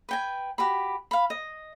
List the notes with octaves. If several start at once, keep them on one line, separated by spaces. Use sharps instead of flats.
B4 G5 G#5
F#4 G4 B5
F5 B5
D#5